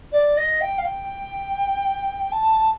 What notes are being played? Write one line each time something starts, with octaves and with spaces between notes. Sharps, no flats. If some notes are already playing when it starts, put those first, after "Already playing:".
D5
D#5
G5
F5
G5
A5